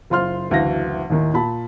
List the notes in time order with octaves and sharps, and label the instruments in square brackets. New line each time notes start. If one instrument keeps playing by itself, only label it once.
[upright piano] F#1 F4 C5 C6 F6
F#1 D2 E3 F#4 F5 A#6
D#2 A2 D#3
A#2 A5 B5